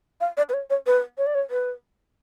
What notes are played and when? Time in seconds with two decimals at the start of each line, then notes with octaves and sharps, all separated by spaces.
0.21 F5
0.37 D5
0.49 B4
0.53 C#5
0.70 C#5
0.87 B4
1.18 C#5
1.27 D5
1.35 C#5
1.50 B4